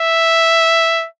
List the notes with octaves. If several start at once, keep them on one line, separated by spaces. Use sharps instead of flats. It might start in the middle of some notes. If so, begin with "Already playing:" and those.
Already playing: E5